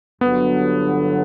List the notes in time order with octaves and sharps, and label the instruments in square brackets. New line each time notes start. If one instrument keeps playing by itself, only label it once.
[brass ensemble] G1 G2 D3 F#3 [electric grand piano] B3